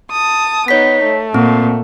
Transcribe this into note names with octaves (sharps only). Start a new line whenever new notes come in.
A5 D#6
B3 D#4 C#5 B6
A3
A#2 C4